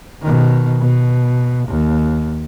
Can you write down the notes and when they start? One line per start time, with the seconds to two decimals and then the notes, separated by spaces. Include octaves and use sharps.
0.22 B2 D#3
0.80 B2
1.68 D#2